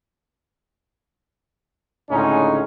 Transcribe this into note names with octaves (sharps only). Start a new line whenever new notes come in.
C#2 A2 D3 G#3 C#4 D#4